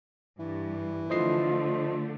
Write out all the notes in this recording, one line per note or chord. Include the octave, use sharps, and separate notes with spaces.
G2 E3
D3 F3 A3 F4 C5 D#5 C7